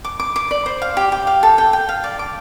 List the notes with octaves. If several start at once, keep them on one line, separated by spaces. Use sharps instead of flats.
D6
D6
D6
D5
C5
F5
G4
G4
F5
A4
G5
G5
F5
D5
D6